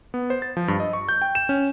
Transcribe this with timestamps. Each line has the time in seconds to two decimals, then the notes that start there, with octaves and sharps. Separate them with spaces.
0.14 B3
0.30 C5
0.42 A6
0.57 F3
0.68 G2
0.80 D#5
0.93 C#6
1.09 G6
1.22 G5
1.35 E7
1.49 C#4